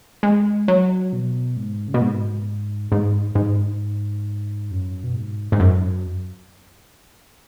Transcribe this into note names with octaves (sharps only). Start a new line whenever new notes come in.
G#3
F#3
B2
G#2
C#3
B2
G#2
G#2
G#2
F#2
B2
G#2
G#2
F#2